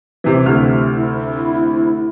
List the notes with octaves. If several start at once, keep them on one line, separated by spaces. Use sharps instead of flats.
C3 E3
D2 C3 F6
E4